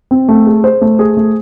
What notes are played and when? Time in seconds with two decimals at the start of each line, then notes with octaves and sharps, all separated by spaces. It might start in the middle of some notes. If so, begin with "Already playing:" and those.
0.11 C4
0.29 A3
0.47 G#4
0.64 C5
0.81 A3
0.99 G#4
1.17 A3